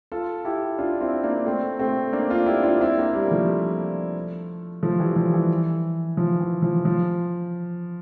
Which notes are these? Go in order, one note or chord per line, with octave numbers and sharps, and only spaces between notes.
F4 A4
E4 G4
D4 F4
C4 E4
A#3 D4
A3 C4
A3 C4
A#3 D4
D4 F4
E4 G4
D4 F4
C4 E4
A#3 D4
G3 A#3
F3 A3
F3 A3
E3 G3
F3
E3
F3
E3
F3
F3